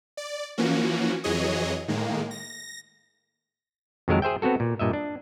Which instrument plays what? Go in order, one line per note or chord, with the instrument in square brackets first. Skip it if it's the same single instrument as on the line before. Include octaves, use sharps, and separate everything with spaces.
[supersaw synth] D5
E3 F3 A#3 C#4 F#4
F2 E3 F#3 G#4 C#5 D#5
A2 D#3 G#3 A#3
A#6
[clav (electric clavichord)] F2 D#3 F#3 G#3 A#4 A5
G#4 C5 E5 G5
B3 C4 F#4 A4
A#2
G2 A#2 D#5 E5
D4